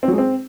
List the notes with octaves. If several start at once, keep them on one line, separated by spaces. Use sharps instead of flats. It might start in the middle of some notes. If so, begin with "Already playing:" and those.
C4
F#3
G#3
C4